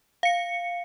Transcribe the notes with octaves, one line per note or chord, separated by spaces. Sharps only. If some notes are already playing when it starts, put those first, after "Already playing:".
F5 C#7